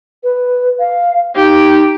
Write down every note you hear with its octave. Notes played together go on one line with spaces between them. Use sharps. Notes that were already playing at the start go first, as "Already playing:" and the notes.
B4
F5
D#4 G4